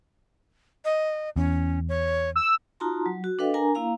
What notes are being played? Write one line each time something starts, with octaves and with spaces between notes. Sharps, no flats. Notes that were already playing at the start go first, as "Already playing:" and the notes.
D#5
E2 C#4
C#5
E6
D#4 F4 F#4 A5 A#5 C6
F#3
F#4
D4 A4 B4 D#5 F5 G5
D4 A#4 G#5 A#5
A#3 E4 F5 A#5